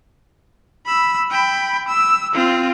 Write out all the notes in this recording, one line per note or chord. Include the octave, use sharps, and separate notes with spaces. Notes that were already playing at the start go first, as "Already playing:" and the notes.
B5 E6
G5 B5
E6
C4 F4